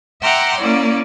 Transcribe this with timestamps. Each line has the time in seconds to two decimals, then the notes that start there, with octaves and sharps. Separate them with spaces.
0.23 E5 F#5 G5 A#5 C6 D6
0.58 A#3 C#4 E4 D5